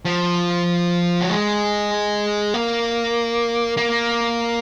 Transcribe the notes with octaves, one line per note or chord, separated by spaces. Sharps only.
F3
F#3
G#3
A#3
A#3